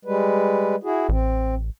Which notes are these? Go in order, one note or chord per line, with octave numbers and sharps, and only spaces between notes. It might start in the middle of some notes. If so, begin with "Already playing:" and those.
G3 G#3 B4
E4 F#4 G#4
A1 C4